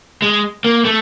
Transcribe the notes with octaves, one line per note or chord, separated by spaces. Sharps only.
G#3
A#3
A3